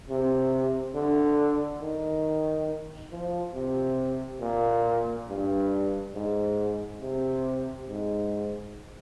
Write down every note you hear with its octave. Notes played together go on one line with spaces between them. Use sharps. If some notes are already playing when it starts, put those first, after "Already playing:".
C3
D3
D#3
F3
C3
A#2
G2
G#2
C3
G#2